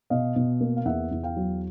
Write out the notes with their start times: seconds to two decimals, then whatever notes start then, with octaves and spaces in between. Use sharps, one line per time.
0.10 B2 D#5 F5
0.36 B2
0.61 A#3
0.77 F5
0.85 E2 E5 F#5
1.11 E2
1.23 F5 G5
1.36 F#3